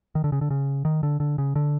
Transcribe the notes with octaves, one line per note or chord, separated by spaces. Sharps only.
D#3
D3
C#3
D3
C#3
D#3
D3
D3
C#3
D3